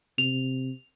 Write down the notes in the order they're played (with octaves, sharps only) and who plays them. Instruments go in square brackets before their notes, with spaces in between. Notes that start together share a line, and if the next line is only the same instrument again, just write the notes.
[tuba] C3 [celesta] F7